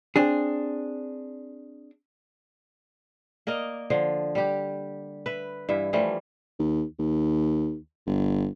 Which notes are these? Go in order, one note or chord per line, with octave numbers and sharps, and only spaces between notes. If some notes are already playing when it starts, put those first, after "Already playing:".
C4 D4 G#4
A#3 A#4 D5 D#5
D3 F3
G3 G4
B4 E5
G2 E3 E5
E3 F3 G3 A3
D#2
D#2
G1